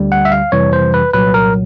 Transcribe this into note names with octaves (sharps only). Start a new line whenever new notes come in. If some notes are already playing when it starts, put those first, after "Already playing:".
Already playing: D2 D3 G3
F#5
E5
F5
F2 C3 E3 G3 C#5
C5
B4
C2 A#2 F#3 B4
A#4